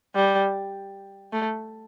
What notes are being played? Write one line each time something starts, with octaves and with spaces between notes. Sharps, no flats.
G3
A3